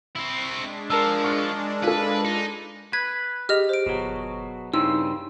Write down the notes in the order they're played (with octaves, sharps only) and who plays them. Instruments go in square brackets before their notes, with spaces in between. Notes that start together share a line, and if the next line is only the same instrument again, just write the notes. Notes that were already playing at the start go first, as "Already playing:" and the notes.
[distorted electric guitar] C4 E4 [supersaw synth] C#6 B6
[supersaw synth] G#3 D4
[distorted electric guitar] F3 [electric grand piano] A#4 A5 E6
[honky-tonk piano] C#6 F6 C#7
[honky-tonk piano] F4 A4 [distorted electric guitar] B4
[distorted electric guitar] D#4
[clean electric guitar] B4 [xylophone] G#6
[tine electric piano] G4 [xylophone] G#4 D#5 F6
[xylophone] C5 D7
[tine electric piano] G1 [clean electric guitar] B2 F#3
[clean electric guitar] G2 C#3 C4 [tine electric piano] D#4 E4 C6 [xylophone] E6